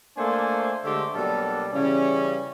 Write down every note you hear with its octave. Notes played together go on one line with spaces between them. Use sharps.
A3 A#3 D4 A4 C5 G#5
D3 G#3 A3 G4 C5 E5
B2 F#3 G3 A#3 D4 A4
C#3 E3 G3 C#4